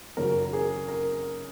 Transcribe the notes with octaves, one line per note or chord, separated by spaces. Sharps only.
F#2 C#3 F#3 A#4
A#4
G#4
A#4